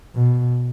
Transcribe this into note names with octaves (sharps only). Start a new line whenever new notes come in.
B2